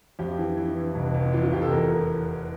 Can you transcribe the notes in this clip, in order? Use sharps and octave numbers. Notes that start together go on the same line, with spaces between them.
F2 G4
E3
E3
E3
F1
F1
E3 F4
F4
F1 G4
A4
E2 A#4